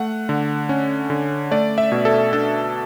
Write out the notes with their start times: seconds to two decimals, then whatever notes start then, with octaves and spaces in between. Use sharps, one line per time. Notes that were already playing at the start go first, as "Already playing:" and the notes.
Already playing: A3 F#5
0.29 D3
0.69 C#4
1.10 D3
1.51 A3 D5
1.78 E5
1.92 B2
2.05 A4
2.33 D4 A4